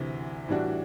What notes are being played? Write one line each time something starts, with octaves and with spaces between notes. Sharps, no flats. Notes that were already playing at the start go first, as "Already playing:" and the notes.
Already playing: D2 C3 E3
A2 E3 G3 D4 F#4